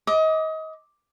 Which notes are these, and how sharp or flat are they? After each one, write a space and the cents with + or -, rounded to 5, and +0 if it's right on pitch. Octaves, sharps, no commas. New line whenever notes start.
D#5 +30 D6 +0